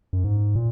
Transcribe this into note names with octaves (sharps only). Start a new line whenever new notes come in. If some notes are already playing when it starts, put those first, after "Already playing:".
F#2
G#2
A#2